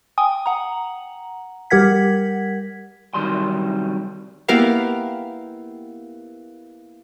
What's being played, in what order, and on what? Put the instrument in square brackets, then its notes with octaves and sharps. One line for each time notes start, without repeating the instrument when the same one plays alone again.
[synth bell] G5 G#5 D#6
F#5 A#5
G3 G4 A#4 F#5 G#6 B6
[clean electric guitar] C2 D#3 F#3 G3 C6
[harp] A#3 B3 E4 G4 A#4 F5